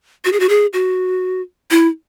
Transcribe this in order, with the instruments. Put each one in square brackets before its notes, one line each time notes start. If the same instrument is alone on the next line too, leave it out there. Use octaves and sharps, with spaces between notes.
[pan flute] F#4
G#4
F#4
G#4
F#4
E4